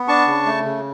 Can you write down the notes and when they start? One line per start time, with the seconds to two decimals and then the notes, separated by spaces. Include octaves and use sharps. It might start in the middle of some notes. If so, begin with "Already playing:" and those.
Already playing: B3
0.08 D4 A5 C#6
0.27 C#3
0.46 A3
0.65 C#3